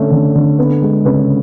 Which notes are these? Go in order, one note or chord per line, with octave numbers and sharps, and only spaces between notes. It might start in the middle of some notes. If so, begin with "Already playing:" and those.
Already playing: D3 A3 C#4
D3
D3
B3
G#3
C#3 B4